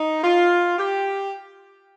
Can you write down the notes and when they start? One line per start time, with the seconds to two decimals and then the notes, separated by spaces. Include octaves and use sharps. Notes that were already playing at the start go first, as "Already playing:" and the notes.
Already playing: D#4
0.23 F4
0.77 G4